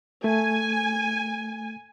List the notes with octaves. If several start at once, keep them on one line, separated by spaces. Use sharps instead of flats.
A3 G#5